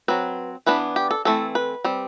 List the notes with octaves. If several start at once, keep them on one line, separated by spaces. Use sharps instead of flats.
F#3 C4 B4
E3 B3 D4 B4
G4
A4
E3 A3 C4 A4
B4
G3 C4